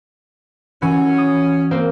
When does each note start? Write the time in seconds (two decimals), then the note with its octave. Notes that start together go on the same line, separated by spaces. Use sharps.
0.82 E3 C#4 F#4
1.18 D#6
1.71 A#3 C4 C5